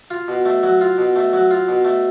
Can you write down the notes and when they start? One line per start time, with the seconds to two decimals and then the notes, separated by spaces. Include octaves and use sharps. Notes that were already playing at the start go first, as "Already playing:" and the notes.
0.11 F4
0.28 B2
0.46 A3
0.63 F#3
0.81 F4
0.98 B2
1.16 A3
1.33 F#3
1.51 F4
1.68 B2
1.85 A3